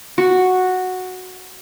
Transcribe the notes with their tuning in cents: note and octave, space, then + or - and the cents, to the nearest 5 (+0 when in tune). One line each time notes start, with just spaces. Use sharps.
F#4 -5